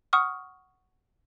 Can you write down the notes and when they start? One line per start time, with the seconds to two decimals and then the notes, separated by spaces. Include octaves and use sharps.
0.13 F#5 C#6 D#6 F6